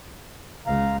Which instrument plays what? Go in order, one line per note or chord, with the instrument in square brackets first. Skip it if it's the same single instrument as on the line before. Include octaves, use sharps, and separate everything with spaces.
[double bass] C#2 [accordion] F5 A#5